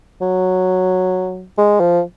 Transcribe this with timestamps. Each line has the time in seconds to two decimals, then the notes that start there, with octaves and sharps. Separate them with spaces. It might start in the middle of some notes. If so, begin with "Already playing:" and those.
0.21 F#3
1.58 G#3
1.80 F3